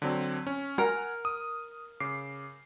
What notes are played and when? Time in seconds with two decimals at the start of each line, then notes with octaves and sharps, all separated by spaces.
0.02 D3 F#3 C4
0.47 C#4
0.78 A#4 F#5 G#5 F6
1.25 D#6
2.00 C#3 D6 C7